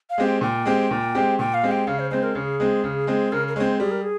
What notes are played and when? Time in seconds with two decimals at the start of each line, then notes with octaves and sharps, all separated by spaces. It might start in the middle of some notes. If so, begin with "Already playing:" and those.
0.10 F5
0.18 G#3 C4 G4
0.26 G5
0.41 A#2 G5
0.65 G#3 C4 G4
0.91 A#2
1.15 G#3 C4 G4
1.39 A#2 G5
1.54 F5
1.63 G#3 C4 G4
1.71 G5
1.87 C#3 F5
1.99 C5
2.10 G#3 C4 C5
2.23 A#4
2.35 C#3 G#4
2.60 G#3 C4
2.84 C#3
3.07 G#3 C4
3.32 C#3 A#4
3.48 A#4
3.56 G#3 C#5
3.60 C4 C5
3.80 G3 G#4
3.91 A#4
4.01 G#4